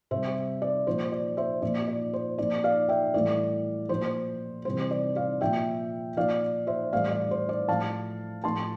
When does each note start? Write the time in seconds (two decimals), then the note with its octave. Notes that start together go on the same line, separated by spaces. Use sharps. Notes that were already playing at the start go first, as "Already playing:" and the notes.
0.11 C3 G3 C5 E5
0.62 D5
0.87 A#2 F3 C5
1.12 D5
1.37 C5 E5
1.62 A#2 F3 D5
1.88 D5
2.13 C5
2.38 A#2 F3 D5
2.64 D5 F5
2.89 E5 G5
3.14 A2 E3 G3 D5
3.89 A#2 F3 C5
4.65 C3 E3 G3 C5
4.91 D5
5.16 D5 F5
5.41 A#2 F3 E5 G5
6.17 A#2 F3 D5 F5
6.67 C5 E5
6.93 A2 E3 G3 D5 F5
7.11 D5
7.31 C5
7.49 D5
7.69 A2 F3 F5 A5
8.44 A2 F3 A5 C6